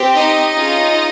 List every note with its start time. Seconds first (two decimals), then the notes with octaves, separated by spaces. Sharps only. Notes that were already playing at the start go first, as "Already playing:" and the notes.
Already playing: C4 G4
0.15 D#4 D#5
0.52 C#4 F4 G#4